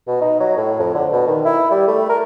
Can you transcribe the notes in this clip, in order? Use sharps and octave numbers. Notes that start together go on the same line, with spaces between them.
B2
D#4
F#3
A2
F2
D3
B2
D#3
E4
G3
A3
A#4